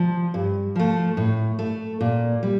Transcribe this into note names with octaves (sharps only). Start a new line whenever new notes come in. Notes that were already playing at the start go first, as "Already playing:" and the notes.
Already playing: F3
G2
F3 A3
A2
A3
A#2
G3